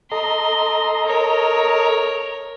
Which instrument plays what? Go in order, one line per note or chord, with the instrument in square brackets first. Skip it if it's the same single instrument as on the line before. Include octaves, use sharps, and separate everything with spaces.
[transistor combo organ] A4 D#5 A#5 [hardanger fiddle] C6
[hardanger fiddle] A#4 C#5